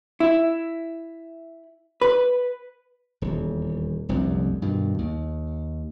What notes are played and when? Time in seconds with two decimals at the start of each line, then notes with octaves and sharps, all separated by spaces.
0.20 E4
2.02 B4
3.22 D#1 E2
4.09 F1 C2 F#2 D3
4.62 G2 B2 D#3
4.99 D#2